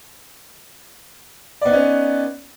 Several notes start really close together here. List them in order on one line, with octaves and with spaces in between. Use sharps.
D5 B3 D#4 C#4